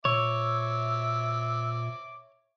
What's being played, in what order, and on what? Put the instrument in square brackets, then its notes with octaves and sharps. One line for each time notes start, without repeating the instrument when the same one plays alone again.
[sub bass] A#2 [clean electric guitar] C#5 [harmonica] E5 D6 [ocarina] E6